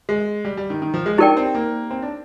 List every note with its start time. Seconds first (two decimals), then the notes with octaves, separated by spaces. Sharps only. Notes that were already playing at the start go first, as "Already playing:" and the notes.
0.09 G#3
0.45 G3
0.57 G3
0.70 D#3
0.82 D#3
0.94 F3
1.06 G#3
1.18 D4 D#4 G4 A#4 D5 G5
1.37 C4
1.55 A#3
1.90 C4
2.02 D4